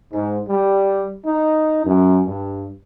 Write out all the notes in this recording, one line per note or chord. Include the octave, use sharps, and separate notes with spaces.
G#2
G3
D#4
F#2
G2